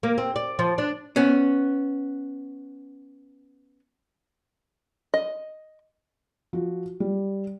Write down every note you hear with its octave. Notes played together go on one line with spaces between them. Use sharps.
A#3
C4
D5
F3
D4
B3 C#4
D#5
F3 F#4
G3